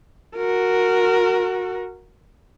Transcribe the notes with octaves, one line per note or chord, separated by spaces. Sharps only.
F#4 A#4